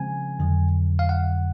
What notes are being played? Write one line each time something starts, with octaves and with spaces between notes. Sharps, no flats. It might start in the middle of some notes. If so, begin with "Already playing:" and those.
Already playing: C#3 F3 G#3 C4 G#5
F2 D3 F#3
F5
F#5